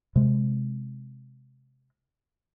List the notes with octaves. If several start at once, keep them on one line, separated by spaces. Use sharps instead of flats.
C3 G#3